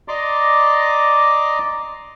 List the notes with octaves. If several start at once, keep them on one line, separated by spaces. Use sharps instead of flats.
D5 D#5 A#5 C6 D6